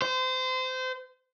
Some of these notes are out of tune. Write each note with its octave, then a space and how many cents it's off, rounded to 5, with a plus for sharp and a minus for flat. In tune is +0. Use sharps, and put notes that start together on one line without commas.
C5 -25